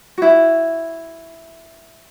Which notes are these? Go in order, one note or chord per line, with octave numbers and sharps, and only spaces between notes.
E4 F#4